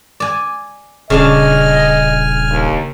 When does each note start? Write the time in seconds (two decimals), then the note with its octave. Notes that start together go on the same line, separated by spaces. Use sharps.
0.20 D5 G#5
1.10 D#1 C#3 D4 D#5 G#5 A5 F6
2.50 D#2